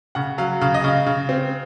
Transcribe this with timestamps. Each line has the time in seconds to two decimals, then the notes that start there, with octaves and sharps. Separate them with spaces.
0.15 C#3 F#5
0.38 F#3 F5
0.61 C#3 F5
0.74 D#5
0.84 C#3 F5
1.06 C#3
1.29 C4